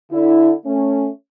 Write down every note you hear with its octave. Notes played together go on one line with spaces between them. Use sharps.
D3 E4
A3 C#4